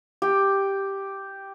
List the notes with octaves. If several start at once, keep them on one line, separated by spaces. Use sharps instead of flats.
G4